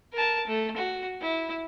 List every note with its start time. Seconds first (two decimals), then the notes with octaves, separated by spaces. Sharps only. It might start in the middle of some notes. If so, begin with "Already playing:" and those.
0.13 A#4 A5
0.47 A3
0.77 F#4
1.21 E4